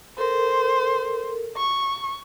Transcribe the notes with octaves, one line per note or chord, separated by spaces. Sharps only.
A4 A#4 C5
C#6